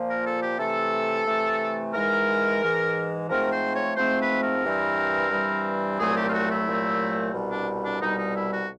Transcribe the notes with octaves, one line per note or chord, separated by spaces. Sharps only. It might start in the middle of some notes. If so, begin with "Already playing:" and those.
Already playing: A#2 F3 A#3
A#4
A4
G4
C3 E3 A3 A4
C3 E3 A3
G#2 E3 G#3 A#4
G#2 E3 G#3
G#2 F3 A3 C4 A#4
C5
C#5
G#2 F3 A3 C4 C5
B4
A#4
G2 E3 G3 C4
G2 E3 G3 C4
C2 A#2 F#3 A3 C4 G#4
G4
F4
F#4
E4
C2 A#2 F#3 A3 C4
C2 B2 G3
D4
D4
C2 B2 G3 D#4
D#4
E4
F#4